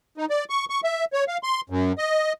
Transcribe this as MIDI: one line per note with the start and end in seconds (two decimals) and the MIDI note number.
0.17 0.26 63
0.30 0.44 74
0.50 0.65 85
0.70 0.80 85
0.84 1.05 76
1.13 1.24 73
1.28 1.37 77
1.43 1.61 84
1.70 1.92 42
1.98 2.33 75